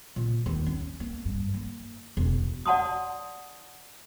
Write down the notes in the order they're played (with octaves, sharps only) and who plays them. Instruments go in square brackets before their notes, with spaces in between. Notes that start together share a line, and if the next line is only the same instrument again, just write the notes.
[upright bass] A#2
D#2
C#4
A#3
G2
A#3
E1
[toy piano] D5 F#5 A5 C6 D#6